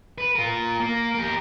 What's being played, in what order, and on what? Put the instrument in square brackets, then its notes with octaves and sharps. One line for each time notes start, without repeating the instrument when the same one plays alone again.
[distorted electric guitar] B4
F4 A#4
A#3
G4 A#4